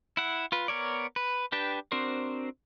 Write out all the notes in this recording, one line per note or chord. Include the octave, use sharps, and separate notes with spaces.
E4 F#5
F4 B4
B3 A#4 C#5 D5
B4
D4 G4 B4 G5 A5
C4 D4 F#4 A#4 C5